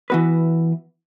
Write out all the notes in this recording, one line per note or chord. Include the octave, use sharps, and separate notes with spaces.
E3 B3 F#4 B4